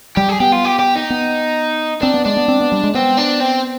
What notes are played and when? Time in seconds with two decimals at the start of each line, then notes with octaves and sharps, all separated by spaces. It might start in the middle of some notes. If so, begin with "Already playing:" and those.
0.17 G3 G4
0.29 G#4
0.40 B3 G4
0.52 F4
0.65 G4
0.79 G4
0.95 D#4
1.10 B3
2.02 C4 D4
2.14 B3
2.25 G#3 D4
2.37 B3
2.48 C4
2.61 B3
2.72 G3
2.84 G#3
2.95 B3 C4
3.18 D4
3.41 C4